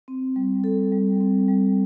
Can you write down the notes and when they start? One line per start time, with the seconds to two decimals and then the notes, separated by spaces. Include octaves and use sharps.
0.08 C4
0.36 G3
0.64 A4
0.92 G3
1.21 C4
1.48 G3